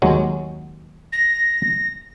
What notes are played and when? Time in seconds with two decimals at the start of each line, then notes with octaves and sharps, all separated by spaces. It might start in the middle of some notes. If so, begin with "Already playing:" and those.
0.02 D#2 F#3 G#3
1.13 A#6